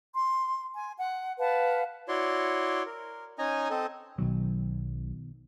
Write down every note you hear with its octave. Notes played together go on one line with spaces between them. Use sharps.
C6
G#5
F#5
B4 F5 F#5 A5
E4 F#4 C#5 D5 C6
A#4
C#4 D#4 D#5 G#5 A#5
C4 A4 D#5
B1 B2 D#3 F#3